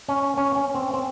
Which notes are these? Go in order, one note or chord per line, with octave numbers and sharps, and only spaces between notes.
C#4
C#4
C#4
C4
C4